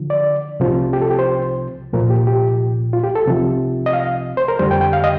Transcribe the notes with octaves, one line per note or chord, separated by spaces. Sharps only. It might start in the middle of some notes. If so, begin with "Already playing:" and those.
Already playing: D3 F3
D5
C2 C3 F3
G4
A4
G4
C5
C2 A#2 F3 A#4
G4
G4
F4
G4
A4
C2 C3 F3
D#5
F5
C5
A#4
F2 D3 G3 C5
G5
G5
F5
D#5